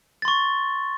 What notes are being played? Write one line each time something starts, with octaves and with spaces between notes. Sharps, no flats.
C6 C#6 A6